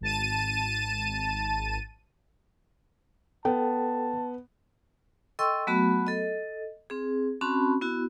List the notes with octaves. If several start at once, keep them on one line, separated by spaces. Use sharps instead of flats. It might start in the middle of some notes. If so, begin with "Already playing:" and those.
G#1 A5 D#7
B3 A4 G5 A5
A4 D#5 G5 C6 C#6 E6
F#3 A3 B3 F#4 B5
A4 D#5
C4 G#4
C4 C#4 F#4 A5 B5
B3 E4 F#4